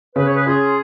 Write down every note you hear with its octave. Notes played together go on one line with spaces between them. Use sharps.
C#3 B4
C#5
G#4 B4
C#4 F4 G#4